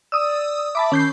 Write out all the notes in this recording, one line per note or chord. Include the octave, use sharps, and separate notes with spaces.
D5 D#6 E6
E5 A5 B5 D6
D#3 C#4 G6 C7